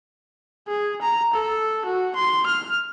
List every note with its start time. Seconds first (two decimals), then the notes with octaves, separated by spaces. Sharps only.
0.68 G#4
1.02 A#5
1.34 A4
1.85 F#4
2.16 C6
2.47 F6